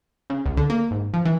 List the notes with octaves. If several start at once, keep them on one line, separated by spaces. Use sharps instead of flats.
C#3
C#2
D3
A#3
G#1
F3
E3